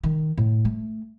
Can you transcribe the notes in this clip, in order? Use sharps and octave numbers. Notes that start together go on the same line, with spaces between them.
D#3
A2
A3